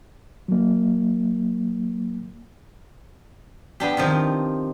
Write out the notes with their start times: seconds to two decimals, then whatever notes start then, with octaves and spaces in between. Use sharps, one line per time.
0.48 F#3 A#3
3.80 B3 D4 G4
3.97 C3 D#3 F3